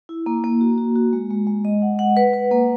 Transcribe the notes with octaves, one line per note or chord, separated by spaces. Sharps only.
E4
A#3
A#3
F#4
F#4
F#4
G#3
G#3
G#3
D#5
F#5
F#5
B4
B4
A#3